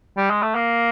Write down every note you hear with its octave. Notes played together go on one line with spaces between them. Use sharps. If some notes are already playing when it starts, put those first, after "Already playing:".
G3
G#3
A3
A#3